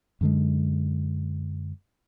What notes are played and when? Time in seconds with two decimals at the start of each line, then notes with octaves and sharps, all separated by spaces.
0.21 F#2 D3 G#3